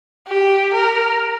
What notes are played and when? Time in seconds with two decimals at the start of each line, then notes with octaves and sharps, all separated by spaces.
0.27 G4
0.73 A#4